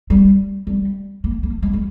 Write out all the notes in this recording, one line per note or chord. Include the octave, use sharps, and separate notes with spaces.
G3
G3
A#3
A#3
G#3
G3